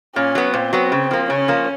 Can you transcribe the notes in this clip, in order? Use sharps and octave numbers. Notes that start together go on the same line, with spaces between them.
A#2 C#4
F#3 B3
A#2 C4
F#3 B3
C#3
F3 A#3
C#3 C#4
F3 A#3